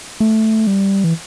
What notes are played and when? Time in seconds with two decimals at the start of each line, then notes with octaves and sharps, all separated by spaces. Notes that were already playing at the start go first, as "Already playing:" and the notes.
0.20 A3
0.67 G3
1.04 E3